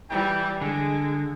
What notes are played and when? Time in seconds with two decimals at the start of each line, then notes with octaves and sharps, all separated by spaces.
0.10 E3 G3 G5
0.61 D3 G#3 G#5